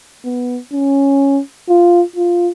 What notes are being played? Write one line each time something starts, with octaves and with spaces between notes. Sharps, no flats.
B3
C#4
F4
F4